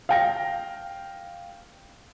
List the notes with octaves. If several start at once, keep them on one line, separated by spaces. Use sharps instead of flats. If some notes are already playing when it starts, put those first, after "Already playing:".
F5 G5 A#6